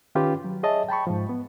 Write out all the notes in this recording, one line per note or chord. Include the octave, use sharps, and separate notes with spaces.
D#3 C#4 F4 G4 B4
F#3
G#4 C#5 D#5 E5 A5
G5 A5 B5 C#6
G#2 F3
B3